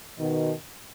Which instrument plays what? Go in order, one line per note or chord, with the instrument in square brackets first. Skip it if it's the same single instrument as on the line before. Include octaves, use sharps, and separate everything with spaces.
[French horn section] B2 D#3